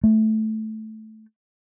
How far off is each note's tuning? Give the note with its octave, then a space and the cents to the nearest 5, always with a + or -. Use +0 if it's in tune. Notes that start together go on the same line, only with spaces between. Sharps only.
A3 -10